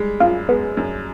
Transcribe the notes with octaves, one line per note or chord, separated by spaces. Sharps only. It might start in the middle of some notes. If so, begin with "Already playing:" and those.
Already playing: G3 G#3
F#2 F4
G#3 B3
F#2